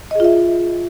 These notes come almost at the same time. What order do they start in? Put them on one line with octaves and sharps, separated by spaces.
D#5 G#4 F4 E5